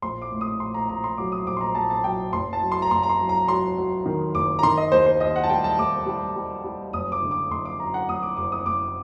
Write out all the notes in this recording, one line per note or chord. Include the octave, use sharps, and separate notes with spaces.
A#1 C6
D6
A2
D#6
A#1 C6
A#5
A#1 A#5
C6
F#3 D6
D#6
A#1 D6
C6
A#5
A#1 A5
A5
F#3 G5
F#1 C6
A5
F#3
C6
A#5
F#1 C6
A#5
C6
F#3
A#5
F#3 C6
F#3
D#3
F#1 D6
A#5
D#3 C6
D#5
D#2 C5
C5
D#2 D#5
F#5
A5
G3 G5
A5
D#2 D6
G3
G3
G3
F#1 D#6
D6
D3
D6
F#1 C6
D6
F#2 A#5
F#5
F#1 D#6
D6
F#1 D6
D#6
F#1 D6